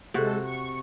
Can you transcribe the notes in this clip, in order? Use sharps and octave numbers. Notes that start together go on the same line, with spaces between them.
C3 G#3 F#4 A4
C#6